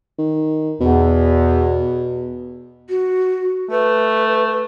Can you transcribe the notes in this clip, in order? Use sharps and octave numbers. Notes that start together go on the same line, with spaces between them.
D#3
E2 B2
F#4
A3 B4